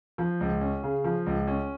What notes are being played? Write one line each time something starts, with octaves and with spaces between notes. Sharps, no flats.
F3
C#2
C#4
C#3
F3
C#2
C#4